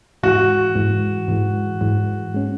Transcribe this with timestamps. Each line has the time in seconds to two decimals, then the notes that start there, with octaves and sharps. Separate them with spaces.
0.23 G#2 E3 G#3 F#4
0.75 G#2 E3 G#3
1.28 G#2 E3 G#3
1.81 G#2 E3 G#3
2.34 G#3 C#4